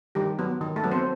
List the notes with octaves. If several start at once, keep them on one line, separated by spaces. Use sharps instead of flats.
D#3 G3 G4
F#3 B3
D#3
A3 A4
F#3 B3
C4 C5